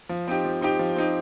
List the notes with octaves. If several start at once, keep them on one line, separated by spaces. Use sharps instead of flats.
F3
C4 D#4 G4
F3
C4 D#4 G4
F3
C4 D#4 G4